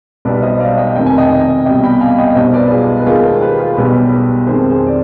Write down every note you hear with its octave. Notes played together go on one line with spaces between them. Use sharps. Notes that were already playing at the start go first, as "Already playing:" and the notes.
B1 B2 G3 B4 D5
C5 D#5
D5 F5
D#5 G5
F1 F2 D#3 G5
G#5
D#5 G5
C2 B2 G3 D#5 G5
G5 B5
F5 G#5
D#5 G5
B1 B2 G3 C5 D#5
B4 D5
F4 G#4
B4
D#2 D#3 G#3 F4 G#4
G#4 C5
G4 B4
F4 G#4
B1 B2 G3 G4 B4
F2 D#3 G#3 G#4 C5
G#4 C5
D5